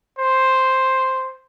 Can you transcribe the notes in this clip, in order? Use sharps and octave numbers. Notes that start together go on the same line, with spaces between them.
C5